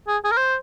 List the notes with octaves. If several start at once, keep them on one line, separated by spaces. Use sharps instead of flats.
G#4
G#4
A#4
C5